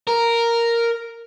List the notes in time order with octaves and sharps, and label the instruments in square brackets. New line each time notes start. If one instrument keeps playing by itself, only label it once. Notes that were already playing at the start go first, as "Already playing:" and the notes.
[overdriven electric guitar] A#4